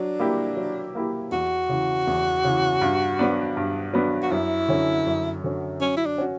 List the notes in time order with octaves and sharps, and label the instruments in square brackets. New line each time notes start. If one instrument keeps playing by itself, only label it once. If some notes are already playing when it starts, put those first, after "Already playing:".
Already playing: [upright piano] F#3 [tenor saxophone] D4
[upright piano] A#3 E4 G4
F#3
A#3 E4 G4
[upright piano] E2 [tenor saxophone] F#4
[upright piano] C#3 E3
E2
C#3 E3
G2
F#3 B3 D4
G2
F#3 B3 D4
[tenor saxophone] F#4
[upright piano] F#2 [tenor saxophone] E4
[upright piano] D3 F#3 C#4
F#2
D3 F#3 C#4
[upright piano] F#3 [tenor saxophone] C#4
[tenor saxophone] E4
D4
[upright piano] C#4 F#4